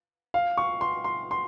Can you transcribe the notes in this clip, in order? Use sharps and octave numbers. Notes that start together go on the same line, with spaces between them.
F5
C#6
C6
C6
C6